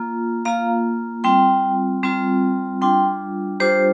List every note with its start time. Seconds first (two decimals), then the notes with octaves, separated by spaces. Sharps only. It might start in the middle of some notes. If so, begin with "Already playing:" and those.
Already playing: A#3 F4
0.45 A#3 F4 F5 A#5
1.24 G3 C4 F4 G5 C6
2.03 G3 C4 F4
2.81 G3 D4 F4 G5 C6
3.60 G3 D4 F4 G4 C5